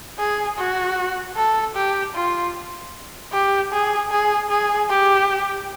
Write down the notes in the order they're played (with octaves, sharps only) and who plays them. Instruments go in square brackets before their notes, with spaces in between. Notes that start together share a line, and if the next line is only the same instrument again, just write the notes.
[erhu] G#4
F#4
A4
G4
F4
G4
G#4
G#4
G#4
G4